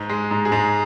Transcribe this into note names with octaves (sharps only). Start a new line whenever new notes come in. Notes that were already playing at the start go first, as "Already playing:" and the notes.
Already playing: G#2
G#3
G#2
G#4
G#2